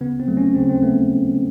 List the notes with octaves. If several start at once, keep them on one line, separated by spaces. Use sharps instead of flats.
C#3 B3
C4
F#3 A3
C#4
C#3 C4
C4
A3 B3